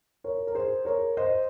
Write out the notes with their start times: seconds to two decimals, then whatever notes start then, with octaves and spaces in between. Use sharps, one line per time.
0.24 A#4 C#5
0.47 A#4
0.55 G#4 C5
0.85 A#4 C#5
1.17 C5 D#5